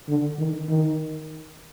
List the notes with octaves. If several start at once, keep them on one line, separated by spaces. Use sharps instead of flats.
D3
D#3
D#3